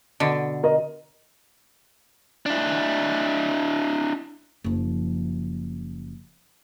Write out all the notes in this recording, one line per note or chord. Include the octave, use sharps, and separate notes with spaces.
B2 D3
A#4 D#5
D4 E4
F#1 F3